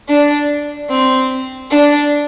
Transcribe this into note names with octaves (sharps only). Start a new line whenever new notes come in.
D4
C4
D4